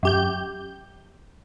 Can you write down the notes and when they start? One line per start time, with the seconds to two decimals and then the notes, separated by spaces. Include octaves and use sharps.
0.03 F#2 G4 G6